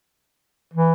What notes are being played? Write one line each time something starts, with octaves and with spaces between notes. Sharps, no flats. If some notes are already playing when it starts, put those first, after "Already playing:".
E3